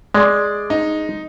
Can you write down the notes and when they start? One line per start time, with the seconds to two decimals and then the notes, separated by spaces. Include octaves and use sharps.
0.14 G#3 D5 C6
0.70 D#4